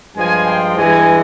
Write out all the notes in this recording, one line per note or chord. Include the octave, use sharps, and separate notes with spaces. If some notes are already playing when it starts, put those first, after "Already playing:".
G2 F3 G#3 G#5
G5
G2 E3 G#3 G#5